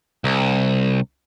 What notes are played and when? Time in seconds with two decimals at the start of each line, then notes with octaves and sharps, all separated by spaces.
0.24 C2